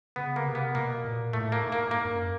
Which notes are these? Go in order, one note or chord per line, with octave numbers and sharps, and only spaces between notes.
C#3 B3
A#3
C3
B3
B2 A#3
A#2
A2 A3
A#3
G#2
A#3
A#3
G2
F#2